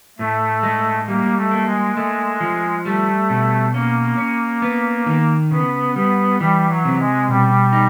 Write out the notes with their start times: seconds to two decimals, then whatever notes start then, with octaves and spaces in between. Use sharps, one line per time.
0.19 A2 A3
0.63 G#3
1.08 G3 A#3
1.37 A3
1.51 A#3
1.66 G#3
1.96 G#3 A3
2.40 F3
2.85 G3 A3
3.30 B2
3.73 A#3 C#4
4.18 C#4
4.62 B3
5.06 D#3
5.51 C#3 B3
5.95 G3 B3
6.39 E3 G3
6.69 F#3
6.85 C3
6.99 G#3
7.28 B2 G3
7.72 D#4